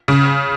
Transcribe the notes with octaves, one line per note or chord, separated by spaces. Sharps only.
C#3